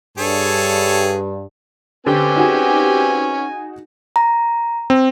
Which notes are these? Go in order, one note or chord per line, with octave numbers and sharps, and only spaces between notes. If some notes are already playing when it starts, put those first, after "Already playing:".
G2 G#4 A4 C#5
D3 C4 C#4 G4 B4 G#5
D#4 F#4 G#4
A#5
C4